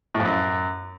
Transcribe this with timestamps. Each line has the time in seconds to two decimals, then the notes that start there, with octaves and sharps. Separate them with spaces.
0.14 A2
0.20 F2
0.25 F#2